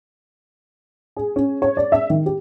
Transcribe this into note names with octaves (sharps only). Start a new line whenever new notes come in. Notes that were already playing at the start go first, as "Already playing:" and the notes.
G#4
C#4
C#5
D5
E5
D#3
G4